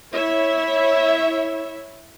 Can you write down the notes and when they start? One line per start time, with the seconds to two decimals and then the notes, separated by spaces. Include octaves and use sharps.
0.12 E4 C#5 E5